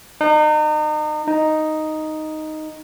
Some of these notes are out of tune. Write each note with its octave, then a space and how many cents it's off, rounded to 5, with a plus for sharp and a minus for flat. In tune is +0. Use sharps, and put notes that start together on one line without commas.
D#4 -35
D#4 +0